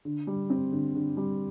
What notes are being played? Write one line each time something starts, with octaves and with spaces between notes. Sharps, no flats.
D3
G3
C4
D3
D3
G3